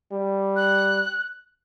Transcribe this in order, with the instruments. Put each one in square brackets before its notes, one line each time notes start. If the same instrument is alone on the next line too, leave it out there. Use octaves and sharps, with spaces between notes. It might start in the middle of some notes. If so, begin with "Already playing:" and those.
[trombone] G3
[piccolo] F#6